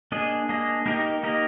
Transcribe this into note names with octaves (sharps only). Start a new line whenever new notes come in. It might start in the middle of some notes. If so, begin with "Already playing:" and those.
A#3 D4 G#4 D#5
A#3 D4 G#4 D#5
A#3 D#4 G4 A#4 D#5
A#3 D#4 G4 A#4 D#5